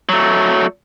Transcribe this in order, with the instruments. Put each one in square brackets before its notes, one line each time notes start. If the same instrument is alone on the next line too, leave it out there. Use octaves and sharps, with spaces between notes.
[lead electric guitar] F#3 A3